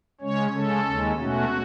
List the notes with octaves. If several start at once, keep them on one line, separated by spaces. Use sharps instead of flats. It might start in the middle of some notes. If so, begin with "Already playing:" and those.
C#3 G#3 C#4 C#5
C#3 G#3 C#4 A4
D#2 D#3 G#3 C#4
B2 A3 C#4 F#4